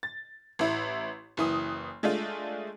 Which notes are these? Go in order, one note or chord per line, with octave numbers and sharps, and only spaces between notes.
A6
A1 E4
F#1 E3 D#6
G#3 A3 D4 F4